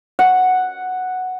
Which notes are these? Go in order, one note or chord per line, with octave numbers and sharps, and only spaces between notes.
F#5